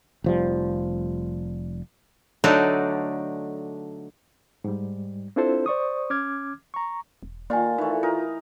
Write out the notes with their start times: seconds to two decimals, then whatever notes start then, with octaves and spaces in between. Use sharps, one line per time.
0.24 F1 F3 G3
2.44 D3 F#3 A3 D4 D#4
4.64 G#2 G3
5.36 C4 D4 E4 F4 A4 C5
5.66 C5 D5 C#6 D#6
6.10 C#4 D6 F6 G#6
6.74 A#5 C#6
7.23 E1
7.50 D#3 A#3 F4 D5 G#5
7.78 E3 A3 D#4
8.03 D#4 F4 A#4 D#5